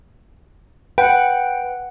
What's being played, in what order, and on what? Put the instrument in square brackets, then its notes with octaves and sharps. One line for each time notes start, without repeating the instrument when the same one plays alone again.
[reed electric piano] B4 [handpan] F#5 [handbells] G5